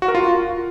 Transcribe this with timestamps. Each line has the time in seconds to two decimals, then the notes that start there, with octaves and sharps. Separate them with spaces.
0.02 F#4
0.08 A#4
0.15 F4